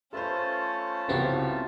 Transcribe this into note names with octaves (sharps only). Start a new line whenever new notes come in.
A3 C#4 F4 A4 B4 C5 A5
C2 C#3 B3 C4 F#4 G4